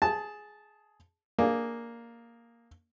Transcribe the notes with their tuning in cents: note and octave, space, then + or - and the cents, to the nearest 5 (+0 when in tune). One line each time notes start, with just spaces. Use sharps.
G#4 +10 A5 -10
A#3 +0 D4 +5 G#4 +0